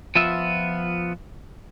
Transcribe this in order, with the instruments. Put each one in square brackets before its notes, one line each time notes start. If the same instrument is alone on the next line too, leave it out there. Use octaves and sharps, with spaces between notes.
[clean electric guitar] F3 B3 F4 E5